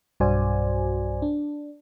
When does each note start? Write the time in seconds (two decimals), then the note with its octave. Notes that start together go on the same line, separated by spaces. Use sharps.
0.20 B1 G2 F#4 C5 D5 G#5
1.22 D4